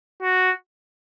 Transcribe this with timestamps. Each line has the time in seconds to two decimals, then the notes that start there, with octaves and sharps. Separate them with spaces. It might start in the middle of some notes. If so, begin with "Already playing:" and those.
0.22 F#4